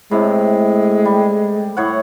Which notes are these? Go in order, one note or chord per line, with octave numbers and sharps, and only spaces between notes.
A2 C3 G#3
G3
A2 C#5 F#5